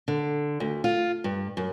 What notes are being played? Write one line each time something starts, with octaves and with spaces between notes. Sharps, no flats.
D3
D2
F4
G2
F#2